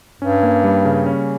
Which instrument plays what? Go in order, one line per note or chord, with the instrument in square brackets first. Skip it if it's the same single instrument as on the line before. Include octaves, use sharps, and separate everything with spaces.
[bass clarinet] G2 [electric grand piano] C#4
[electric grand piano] A#3
G3
C#3
C#4